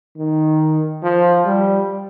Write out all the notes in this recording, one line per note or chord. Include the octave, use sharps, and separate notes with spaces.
D#3
F3
G3